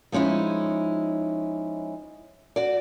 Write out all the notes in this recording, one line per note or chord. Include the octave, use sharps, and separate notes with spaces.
F3 G#3 C#4 D#4 E4
F#4 D5